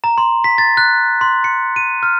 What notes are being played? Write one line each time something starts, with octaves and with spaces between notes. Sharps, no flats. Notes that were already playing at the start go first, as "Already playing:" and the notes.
A#5
C6
B6
A6
F#6
C6
C#7
D#7
F6